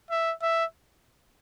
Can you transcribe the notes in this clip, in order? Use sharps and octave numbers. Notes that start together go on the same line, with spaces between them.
E5
E5